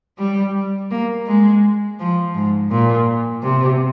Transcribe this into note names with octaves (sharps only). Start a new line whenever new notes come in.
G3
A#3
G#3
F3
G#2
A#2
C3